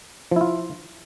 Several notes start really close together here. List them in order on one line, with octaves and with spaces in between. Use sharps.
F3 E4 F4